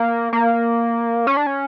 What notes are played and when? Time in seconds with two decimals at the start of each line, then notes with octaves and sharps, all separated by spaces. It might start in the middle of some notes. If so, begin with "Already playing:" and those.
Already playing: A#3
0.33 A#3
1.27 C#4
1.37 D4
1.47 C#4